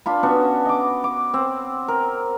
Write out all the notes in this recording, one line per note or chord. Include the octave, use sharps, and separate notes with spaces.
D4 F4 B5
B3 C#4 D4 F#4
D#5 D6
D6
C4
A#4